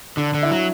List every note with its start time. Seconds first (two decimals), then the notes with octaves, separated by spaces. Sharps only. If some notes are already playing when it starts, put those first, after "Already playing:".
0.17 D3 D4
0.34 D3
0.43 E4
0.51 F#3